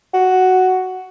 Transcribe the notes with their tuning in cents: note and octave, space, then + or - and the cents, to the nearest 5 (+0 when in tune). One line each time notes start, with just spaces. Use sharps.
F#4 +5